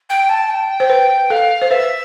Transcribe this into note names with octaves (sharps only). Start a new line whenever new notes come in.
G5
A5
G5
C5
B4
A4 F5
C5
B4 E5